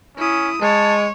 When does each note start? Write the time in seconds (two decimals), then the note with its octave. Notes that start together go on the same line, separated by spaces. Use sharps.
0.17 C#4 E4 D#6
0.62 G#3 C#5 A5